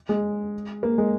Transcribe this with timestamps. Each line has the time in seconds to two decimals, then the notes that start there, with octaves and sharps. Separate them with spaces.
0.09 G#3
0.83 A#3
0.98 G#3